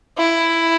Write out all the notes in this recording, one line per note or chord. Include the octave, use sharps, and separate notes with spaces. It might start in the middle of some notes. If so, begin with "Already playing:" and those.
E4